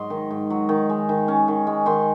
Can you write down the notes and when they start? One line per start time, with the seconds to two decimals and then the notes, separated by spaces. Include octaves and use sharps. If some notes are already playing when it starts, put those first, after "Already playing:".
Already playing: G#2 F#3 D#5 C6
0.10 D#3
0.30 G#2
0.50 F#3
0.69 D#3
0.89 G#3
1.09 D#3
1.28 C#4
1.48 D#3
1.67 G#3
1.86 D#3 C6